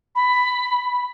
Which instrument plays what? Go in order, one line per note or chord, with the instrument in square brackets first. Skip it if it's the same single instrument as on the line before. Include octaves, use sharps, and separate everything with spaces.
[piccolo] B5